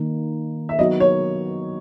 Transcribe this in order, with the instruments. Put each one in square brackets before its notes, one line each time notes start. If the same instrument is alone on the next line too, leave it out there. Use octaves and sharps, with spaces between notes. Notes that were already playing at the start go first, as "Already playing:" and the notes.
Already playing: [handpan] D#3 A#3 D#4
[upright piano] E5
[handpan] F#3 B3 D#4 F#4 [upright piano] D#5
[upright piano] C#5